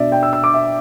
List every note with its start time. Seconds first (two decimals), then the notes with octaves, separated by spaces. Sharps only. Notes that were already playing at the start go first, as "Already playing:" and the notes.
Already playing: B2 B3 D4 D5 E5
0.12 G5
0.23 E6
0.33 E6
0.44 D6
0.54 E5